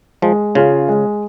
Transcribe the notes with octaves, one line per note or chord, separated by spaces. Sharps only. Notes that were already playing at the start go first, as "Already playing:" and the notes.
F3 G#3
C#3 C#4 F4 G#4
G#3